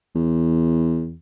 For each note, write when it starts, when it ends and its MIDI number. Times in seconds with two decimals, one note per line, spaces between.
0.15 1.14 40